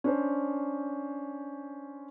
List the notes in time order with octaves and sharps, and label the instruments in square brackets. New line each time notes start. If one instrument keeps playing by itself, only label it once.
[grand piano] C#4 D4 C5